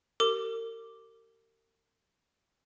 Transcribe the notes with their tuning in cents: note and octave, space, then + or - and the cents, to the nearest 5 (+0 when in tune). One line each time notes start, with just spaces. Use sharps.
G4 -25 A#4 -40 D6 +0